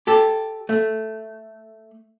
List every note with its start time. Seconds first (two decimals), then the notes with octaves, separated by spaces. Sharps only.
0.07 G4 A4
0.69 A3